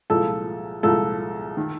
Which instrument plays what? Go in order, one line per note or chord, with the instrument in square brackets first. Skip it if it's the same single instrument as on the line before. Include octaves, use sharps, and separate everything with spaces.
[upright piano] C2 A#2 F3 G#3 A4
C2 A#2 F3 G#3 A4
D#3